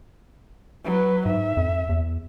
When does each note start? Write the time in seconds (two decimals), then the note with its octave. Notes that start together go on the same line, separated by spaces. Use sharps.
0.85 F#3 B4
1.26 G#2 E5
1.57 F2
1.89 E2